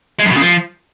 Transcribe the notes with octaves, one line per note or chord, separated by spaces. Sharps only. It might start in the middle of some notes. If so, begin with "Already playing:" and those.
G#3
F#2
B2
C#3
F3